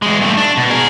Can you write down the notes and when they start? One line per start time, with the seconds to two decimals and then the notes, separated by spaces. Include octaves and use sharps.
0.02 E2 G#3
0.19 G2 A3
0.37 D4
0.57 B2
0.70 G#4 A#4